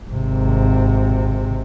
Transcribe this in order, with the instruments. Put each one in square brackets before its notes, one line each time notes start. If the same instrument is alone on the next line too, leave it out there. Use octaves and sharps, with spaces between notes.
[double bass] G#1 C3